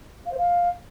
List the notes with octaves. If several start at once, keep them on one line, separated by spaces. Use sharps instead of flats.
F5
C5
F5